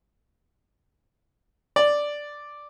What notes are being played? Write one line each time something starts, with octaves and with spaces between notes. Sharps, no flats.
D5